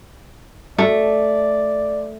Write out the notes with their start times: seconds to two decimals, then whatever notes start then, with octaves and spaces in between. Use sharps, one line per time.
0.78 A3 D5